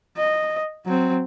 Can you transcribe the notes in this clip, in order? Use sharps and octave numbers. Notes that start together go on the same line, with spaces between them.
D#5
F#3 C4